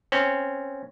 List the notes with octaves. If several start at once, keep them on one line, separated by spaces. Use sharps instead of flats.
C4 C#4